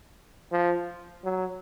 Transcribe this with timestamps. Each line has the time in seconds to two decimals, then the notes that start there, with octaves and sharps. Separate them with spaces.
0.52 F3
1.24 F#3